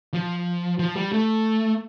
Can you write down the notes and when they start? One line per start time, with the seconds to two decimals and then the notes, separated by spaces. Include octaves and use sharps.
0.14 F3
0.79 F3
0.96 G3
1.12 A3